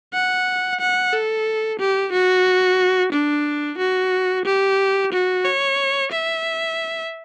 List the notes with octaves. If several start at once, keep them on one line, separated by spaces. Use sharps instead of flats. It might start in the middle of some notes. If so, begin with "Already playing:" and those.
F#5
F#5
A4
G4
F#4
D4
F#4
G4
F#4
C#5
E5